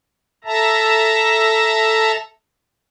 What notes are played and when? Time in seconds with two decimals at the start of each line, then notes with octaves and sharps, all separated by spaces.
0.44 A4 E5 A5 A#5